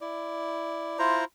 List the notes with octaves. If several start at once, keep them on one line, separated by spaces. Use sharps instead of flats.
E4 D5
E4 F4 C5 A#5